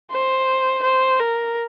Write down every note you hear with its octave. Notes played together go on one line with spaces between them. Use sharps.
C5
C5
A#4